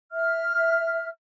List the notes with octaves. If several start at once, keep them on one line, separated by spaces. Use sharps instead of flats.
E5 F6